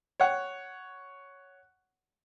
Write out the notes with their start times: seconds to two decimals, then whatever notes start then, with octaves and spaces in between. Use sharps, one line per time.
0.20 C#5 F#5